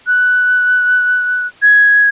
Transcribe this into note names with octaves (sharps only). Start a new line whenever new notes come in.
F#6
G#6